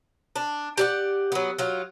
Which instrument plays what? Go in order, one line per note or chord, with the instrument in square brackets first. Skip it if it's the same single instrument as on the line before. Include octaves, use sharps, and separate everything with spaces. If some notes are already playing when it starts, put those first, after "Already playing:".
[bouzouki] D4
G4 D5 F#5
F#3 B3
F#3 F4